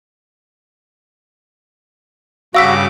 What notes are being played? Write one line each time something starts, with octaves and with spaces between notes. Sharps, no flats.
G2 C#3 F#4 F5 D6 E6 B6